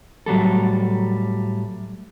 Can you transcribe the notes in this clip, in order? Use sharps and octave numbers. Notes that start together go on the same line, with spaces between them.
A2 F#3 G3 A4